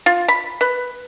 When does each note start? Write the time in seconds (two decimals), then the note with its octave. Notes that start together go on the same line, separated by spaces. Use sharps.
0.06 F4
0.28 B5
0.61 B4